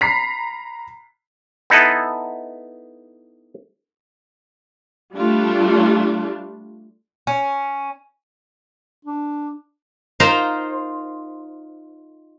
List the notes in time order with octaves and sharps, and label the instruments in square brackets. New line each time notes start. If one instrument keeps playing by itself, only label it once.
[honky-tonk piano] A#5 B5 B6 C7
[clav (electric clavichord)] B3 D#4 E4 A4 B4
[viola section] G3 A3 D4 F4
[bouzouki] C#4
[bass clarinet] D4
[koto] D#4 F4 A#4 C5